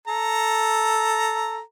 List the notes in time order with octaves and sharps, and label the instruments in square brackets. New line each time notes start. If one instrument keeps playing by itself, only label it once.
[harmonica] A4 A#5